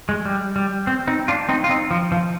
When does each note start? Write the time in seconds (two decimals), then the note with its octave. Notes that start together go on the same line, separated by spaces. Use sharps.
0.09 G#3
0.26 G3
0.56 G3
0.87 C4
1.07 C4 D#4
1.28 D4 F4
1.49 C4 D#4
1.64 F4
1.69 C4 D#4
1.91 F3
2.12 F3